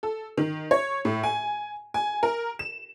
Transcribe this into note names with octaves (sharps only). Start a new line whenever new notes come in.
A4
D#3
C#5
A2
G#5
G#5
A#4
E7